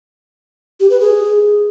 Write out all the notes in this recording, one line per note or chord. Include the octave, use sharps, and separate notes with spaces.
G4
B4
G#4